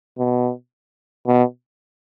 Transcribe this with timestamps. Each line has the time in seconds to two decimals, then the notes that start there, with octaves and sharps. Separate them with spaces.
0.18 B2
1.27 B2